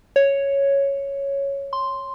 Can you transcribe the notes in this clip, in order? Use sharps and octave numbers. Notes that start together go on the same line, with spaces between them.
C#5
C6